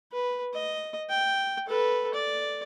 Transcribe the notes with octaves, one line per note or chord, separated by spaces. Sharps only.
B4
D#5
G5
A4 B4
D5